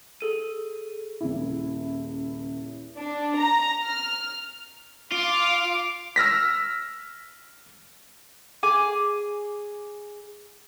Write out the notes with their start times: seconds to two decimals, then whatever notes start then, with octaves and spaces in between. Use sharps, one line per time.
0.21 G#4 A4 D#7
1.21 D#1 C#2 E4
2.97 D4
3.36 A#5
3.83 F6
5.12 F4 F5 D6
6.16 E6 F6 A#6 B6
8.63 G#4 G#5 D6